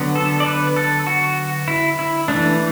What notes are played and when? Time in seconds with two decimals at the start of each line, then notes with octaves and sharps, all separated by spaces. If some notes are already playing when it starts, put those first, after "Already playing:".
Already playing: D3 F#3 B3
0.15 A4
0.40 D5
0.46 B4
0.77 A4
1.07 F#4
1.68 E4
1.99 E4
2.28 E3 A3 D4